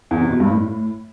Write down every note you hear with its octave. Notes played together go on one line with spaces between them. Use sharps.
E2
C3
B2
G2
A2